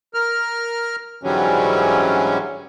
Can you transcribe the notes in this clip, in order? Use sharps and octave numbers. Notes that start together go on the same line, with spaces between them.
A#4 F6
G#2 D3 E3 F#3 G3 C#4